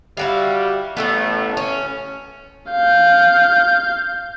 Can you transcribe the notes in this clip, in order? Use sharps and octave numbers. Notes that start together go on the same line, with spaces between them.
G3 E4 F#4 F5
A1 A2 A3 B3
C#4
F5 G6